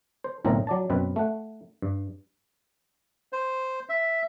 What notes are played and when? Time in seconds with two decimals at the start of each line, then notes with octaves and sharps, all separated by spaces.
0.24 C5
0.45 B1 A2 D3 C4 A#4 D#5
0.67 F#3 D5 A5
0.90 F#2 B2 C4 B4
1.16 A3 F#5
1.82 G2
3.33 C5
3.89 E5